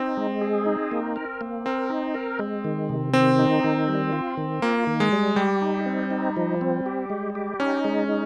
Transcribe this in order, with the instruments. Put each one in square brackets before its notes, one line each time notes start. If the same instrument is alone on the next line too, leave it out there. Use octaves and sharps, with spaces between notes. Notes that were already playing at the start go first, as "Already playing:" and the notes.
Already playing: [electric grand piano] C4 [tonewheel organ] D#4
[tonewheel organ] G#3
G#4
D#4
A#3
A#4
A#3
[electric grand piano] C4 [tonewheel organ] A#4
[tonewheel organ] D#4
A#4
G#3
D#3
C3
[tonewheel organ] D#3 [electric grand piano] C4
[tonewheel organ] D#4
D#3
G3
F4
D#3
[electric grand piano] A#3 [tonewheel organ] F4
[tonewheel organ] D#3
[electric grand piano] G#3
[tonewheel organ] G3
[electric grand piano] G3 [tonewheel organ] G4
[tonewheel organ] D#4
C4
D#4
F3
C4
G4
G#3
G4
[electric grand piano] C#4 [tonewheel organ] D#4
[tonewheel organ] G#3
D#4